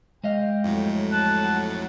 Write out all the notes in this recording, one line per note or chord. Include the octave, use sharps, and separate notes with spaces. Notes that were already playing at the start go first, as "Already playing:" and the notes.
G#3 D#5 F5 G5
F2 A2 F#3
A5 F#6
F#5